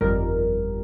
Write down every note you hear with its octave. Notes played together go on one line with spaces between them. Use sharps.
G1 F2 D#3 G3 A#4